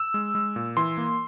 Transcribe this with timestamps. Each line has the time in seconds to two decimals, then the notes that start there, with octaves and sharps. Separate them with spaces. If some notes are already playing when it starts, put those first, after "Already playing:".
Already playing: E6
0.14 G#3
0.35 G#3
0.56 A#2
0.77 E3 C6
0.97 A#3